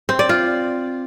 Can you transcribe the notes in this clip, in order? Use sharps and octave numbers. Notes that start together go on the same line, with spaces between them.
C4
D5
F4